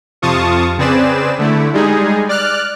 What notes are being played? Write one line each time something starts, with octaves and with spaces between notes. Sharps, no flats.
F2 C3 F4 A5 C#6 D#6
C#3 C4 G#4 B4 D5 E7
D3 A3 E4
G3 G#3 D#4 G#4
D5 F6 F#6